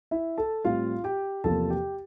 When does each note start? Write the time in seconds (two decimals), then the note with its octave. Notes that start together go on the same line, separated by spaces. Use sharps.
0.11 E4 E5
0.38 A4 A5
0.64 A2 G3 C4 F4 F5
1.04 G4 G5
1.44 E2 C3 F3 A#3 A4 A5
1.70 G4 G5